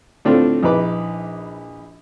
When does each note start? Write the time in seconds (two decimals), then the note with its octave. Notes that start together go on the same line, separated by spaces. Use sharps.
0.25 A2 D3 C4 D4 F4 A4
0.63 A#1 D#4 E4 B4 D6